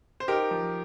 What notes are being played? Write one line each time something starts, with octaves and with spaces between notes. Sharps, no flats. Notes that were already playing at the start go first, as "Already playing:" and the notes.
C5
D#4 G4 A#4
F3